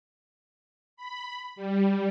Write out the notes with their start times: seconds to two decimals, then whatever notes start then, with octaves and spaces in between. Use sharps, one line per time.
0.97 B5
1.56 G3